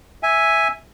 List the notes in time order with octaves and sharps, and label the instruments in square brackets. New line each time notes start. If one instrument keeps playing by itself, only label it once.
[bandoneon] E5 G#5